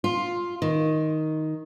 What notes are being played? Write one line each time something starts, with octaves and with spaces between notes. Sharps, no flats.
F4
D#3